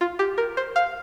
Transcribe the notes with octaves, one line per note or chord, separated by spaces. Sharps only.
F4
G4
A#4
C5
F5